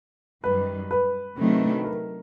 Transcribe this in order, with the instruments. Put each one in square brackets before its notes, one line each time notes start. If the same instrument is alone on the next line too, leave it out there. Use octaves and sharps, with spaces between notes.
[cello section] F#2 D#3 G3 [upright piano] B4
[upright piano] B4
[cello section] C3 D#3 F#3 A3 D4
[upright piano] A#4